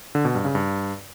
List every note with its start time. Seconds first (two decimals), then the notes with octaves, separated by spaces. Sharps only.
0.15 D3
0.25 B2
0.35 G2
0.45 C#3
0.55 G2